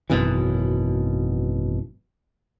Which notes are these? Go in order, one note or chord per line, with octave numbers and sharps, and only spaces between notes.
G#1 F#2 B2 E3